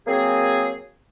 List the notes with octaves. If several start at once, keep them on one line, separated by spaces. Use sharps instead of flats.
F#3 A#3 C4 G#4